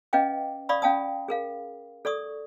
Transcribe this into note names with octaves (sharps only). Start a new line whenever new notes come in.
C#4 B4 D#5 F5 G5 D6
D5 F5 B5 C#6 D#6
C#4 F5 G5 A5 D#6
G#4 A#4 F5
A4 D5 C#6 D#6